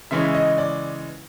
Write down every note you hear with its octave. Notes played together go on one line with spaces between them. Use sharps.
C#3 E3 G#3 C#4 E5
D#5
D5